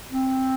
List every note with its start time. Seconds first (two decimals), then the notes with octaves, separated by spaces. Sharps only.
0.12 C4